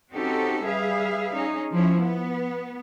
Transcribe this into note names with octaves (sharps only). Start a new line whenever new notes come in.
C4 C#4 D#4 F#4 G4 A4
G3 G#4 B4 E5 F5
C#4 D#4 G#4
F3 C#4 E4
B3